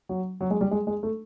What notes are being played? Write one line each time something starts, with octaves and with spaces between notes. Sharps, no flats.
F#3
F#3
G#3
G3
G#3
G#3
A3